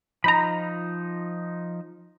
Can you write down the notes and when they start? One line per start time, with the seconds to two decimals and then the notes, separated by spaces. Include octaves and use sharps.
0.24 F3 D#4 A#5 B5